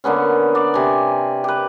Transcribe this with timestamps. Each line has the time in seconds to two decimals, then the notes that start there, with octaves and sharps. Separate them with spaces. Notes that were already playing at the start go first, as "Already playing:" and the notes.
0.04 D3 A#3 B3 C#4
0.55 D5
0.74 C3 G#5
1.44 G4 B4